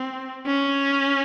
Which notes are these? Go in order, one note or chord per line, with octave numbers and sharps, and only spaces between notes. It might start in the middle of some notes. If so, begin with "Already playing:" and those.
Already playing: C4
C#4